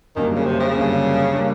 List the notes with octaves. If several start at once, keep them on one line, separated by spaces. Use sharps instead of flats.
F#2 D3 D#3 G3 A#3
C#3
C3
C#3
F#2 D3 G3 A#3
D3 G3 A#3